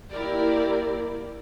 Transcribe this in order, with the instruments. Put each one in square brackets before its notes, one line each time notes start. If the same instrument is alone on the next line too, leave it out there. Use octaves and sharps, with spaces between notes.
[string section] A#3 E4 G4 A#4 D5